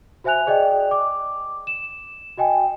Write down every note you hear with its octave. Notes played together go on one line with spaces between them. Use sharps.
F#4 C5 E5 G#5 F#6 F7
G#4 D5 D#5 G5
D6
E7
F#4 D#5 G5 G#5